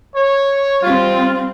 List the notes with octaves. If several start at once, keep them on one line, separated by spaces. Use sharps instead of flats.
C#5
G3 C4 F4